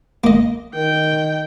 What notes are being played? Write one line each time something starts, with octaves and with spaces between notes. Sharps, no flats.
A#3 D#5
D#3 G5